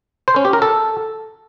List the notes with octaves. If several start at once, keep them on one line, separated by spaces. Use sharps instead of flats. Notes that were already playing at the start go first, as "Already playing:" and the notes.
C5
C#4
G4
A#4
A4